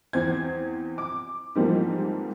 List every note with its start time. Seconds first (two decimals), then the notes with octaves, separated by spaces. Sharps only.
0.13 E2 C4 C5 G#6
0.98 D6
1.55 G#2 E3 F3 G3 A#3 C4